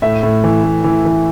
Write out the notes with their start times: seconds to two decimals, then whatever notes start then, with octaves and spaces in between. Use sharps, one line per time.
0.02 A2 E5
0.23 A2
0.44 E3
0.64 A2
0.84 E3
1.05 E3